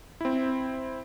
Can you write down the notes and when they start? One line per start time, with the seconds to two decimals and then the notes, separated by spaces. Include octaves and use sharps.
0.21 C4 E4